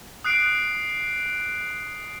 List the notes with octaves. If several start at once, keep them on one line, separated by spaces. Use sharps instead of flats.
D#6 F#6 C7 D7